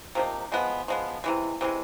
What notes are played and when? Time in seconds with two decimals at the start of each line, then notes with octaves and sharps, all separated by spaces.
0.15 C3 F3 A#3 D#4
0.52 F3 G#3 B3
0.88 F3 G#3 B3
1.24 C3 E3 G#3
1.61 C3 E3 G#3